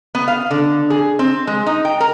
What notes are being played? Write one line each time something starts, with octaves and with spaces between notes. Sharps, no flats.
B3
F5
D3
G#4
C4
G#3
D#4
G5
A#4